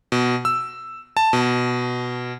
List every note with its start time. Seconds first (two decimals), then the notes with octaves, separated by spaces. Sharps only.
0.12 B2
0.45 E6
1.17 A5
1.33 B2